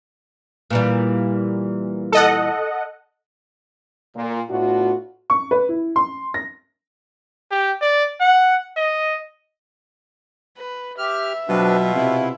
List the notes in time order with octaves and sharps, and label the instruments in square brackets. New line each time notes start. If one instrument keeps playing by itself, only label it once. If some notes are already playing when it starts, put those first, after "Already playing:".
[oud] A#2 E3 G3
[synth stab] A4 D#5 F#5
[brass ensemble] A#2
A2 A3 B3 D4 F4 F#4
[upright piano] C#6
B4
E4
C6
A#6
[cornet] G4
D5
F#5
D#5
[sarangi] B4
[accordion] G4 F6 [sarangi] E5
[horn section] B2 F4 [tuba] F#3 [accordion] C4 D4 B4
[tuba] C3 [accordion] E4